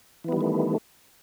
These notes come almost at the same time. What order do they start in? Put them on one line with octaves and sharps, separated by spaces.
E3 B3 G3 D#3 A3